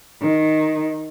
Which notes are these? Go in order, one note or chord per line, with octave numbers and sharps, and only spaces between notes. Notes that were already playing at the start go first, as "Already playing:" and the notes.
D#3